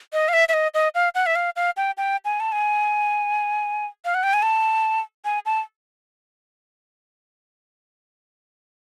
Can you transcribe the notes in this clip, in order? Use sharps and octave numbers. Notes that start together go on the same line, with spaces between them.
D#5
F5
E5
E5
D#5
D#5
F5
F#5
E5
F5
F5
G5
G5
G#5
A5
G#5
F5
F#5
G5
G#5
A5
G#5
A5